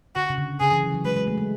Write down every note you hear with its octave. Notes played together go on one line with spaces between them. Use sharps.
D3 F#4
C#3
D3
C#3 G#4
E3
F#3
F#3
G#3 B4
G#3
A3
G#3